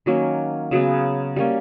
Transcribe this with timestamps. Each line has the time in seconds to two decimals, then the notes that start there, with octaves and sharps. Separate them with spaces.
0.06 D#3 F#3 A#3 C#4
0.71 C#3 F#3 B3
1.36 G3 A#3 C#4